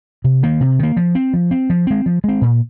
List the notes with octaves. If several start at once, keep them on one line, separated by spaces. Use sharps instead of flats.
C3
D#3 A#3
C3
D#3 A#3
F3
C4
F3
C4
F3
G#3 C4
F3
G#3 C4
A#2